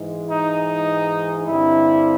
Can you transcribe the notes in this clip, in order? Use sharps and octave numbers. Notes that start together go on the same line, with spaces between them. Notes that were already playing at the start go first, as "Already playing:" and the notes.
Already playing: G#2 E3 G#3
D#4
G2 D3 G3 C4 E4